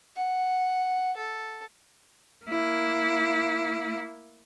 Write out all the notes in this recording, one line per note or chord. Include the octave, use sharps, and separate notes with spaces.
F#5
A4
A#3 E4